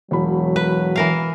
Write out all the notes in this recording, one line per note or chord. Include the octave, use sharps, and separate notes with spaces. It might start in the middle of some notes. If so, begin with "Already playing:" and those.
E1 F#3 B5
B4
E3 A#4 F5